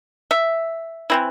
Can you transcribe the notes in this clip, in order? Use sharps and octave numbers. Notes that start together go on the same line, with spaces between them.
E5
E3 C4 E4